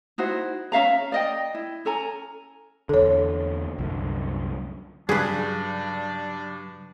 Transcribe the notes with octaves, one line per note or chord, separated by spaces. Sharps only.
D#4 E4 F#4 C5
C#4 E5 F5 A#5
D5 D#5 G5
E4
C#4 A4 G#5 A#5
E2 D3 A4 C#5
C2 F#2 D3
G2 C#3 F#3 D4 G#4 B4